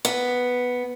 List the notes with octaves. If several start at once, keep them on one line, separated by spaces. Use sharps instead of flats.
B3